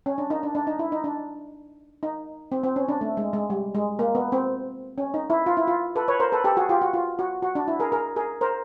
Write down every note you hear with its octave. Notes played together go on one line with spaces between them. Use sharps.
C#4
D4
D#4
D4
D4
D#4
E4
D#4
D4
D#4
C4
C4
C#4
D4
A3
G#3
G#3
G3
G#3
A#3
B3
C4
C#4
D#4
E4
F4
E4
F4
A4 B4
B4 C#5
A#4 C5
A4 B4
G4 A4
F#4 G#4
F4 G4
F#4
F4
F#4
F#4
D4
E4
G#4 A#4
G#4 A#4
G#4 A#4
A#4 C5